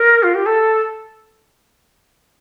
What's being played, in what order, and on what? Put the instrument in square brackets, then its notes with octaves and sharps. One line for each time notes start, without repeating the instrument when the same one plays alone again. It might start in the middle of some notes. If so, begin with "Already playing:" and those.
Already playing: [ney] A#4
F4
G4
A4